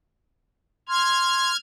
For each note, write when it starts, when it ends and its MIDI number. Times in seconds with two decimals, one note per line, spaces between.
0.89 1.51 84
0.89 1.57 89
0.89 1.57 92